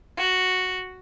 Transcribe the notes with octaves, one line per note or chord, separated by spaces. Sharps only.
F#4